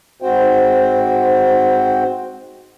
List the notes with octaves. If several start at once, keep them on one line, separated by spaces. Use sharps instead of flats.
G#2 C4 F#4 C5 G5